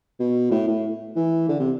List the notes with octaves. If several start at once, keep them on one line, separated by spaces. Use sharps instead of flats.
B2
A2
A2
E3
D3
C3